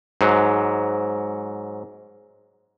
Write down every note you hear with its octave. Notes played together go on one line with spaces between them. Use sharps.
G#2 F#3